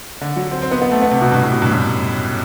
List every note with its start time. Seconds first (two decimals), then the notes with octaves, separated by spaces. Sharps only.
0.21 D3
0.36 F#3
0.51 C4
0.62 C4
0.71 B3
0.82 B3
0.91 A3
1.02 B3
1.11 C3
1.21 B2
1.32 G2
1.42 A2
1.52 B2
1.62 G2
1.72 F#2